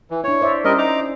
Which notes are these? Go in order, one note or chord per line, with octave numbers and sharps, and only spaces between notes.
E3
D4 E4 C#5
C5 D5 E5
G3 C#4 A#4 C5 D#5
D#4 A#5 D6